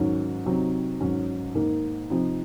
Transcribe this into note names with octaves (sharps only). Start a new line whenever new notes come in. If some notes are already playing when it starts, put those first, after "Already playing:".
Already playing: G#2 D#3 F#3 C#4
C3 F#3 C4 D#4
G#2 D#3 F#3 C#4
G#2 D#3 A#3 D#4
C3 F3 C4 D#4